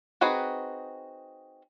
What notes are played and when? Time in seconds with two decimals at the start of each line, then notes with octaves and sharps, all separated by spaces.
0.21 C4 D#4 F#4 G#4 B4